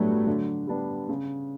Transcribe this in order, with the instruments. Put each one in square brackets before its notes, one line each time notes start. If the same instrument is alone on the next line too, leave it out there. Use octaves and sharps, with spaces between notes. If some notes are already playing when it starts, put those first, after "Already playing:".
Already playing: [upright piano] A2 G3 B3 D4 [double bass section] F#3 A3
[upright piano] D3
G3 B3 D4
C#3